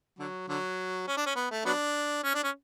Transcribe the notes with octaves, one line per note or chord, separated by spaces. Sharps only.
D3 F#3
D3 F#3
C#4
D4
C#4
B3
A3
F#3 B3 D4
C#4
D4
C#4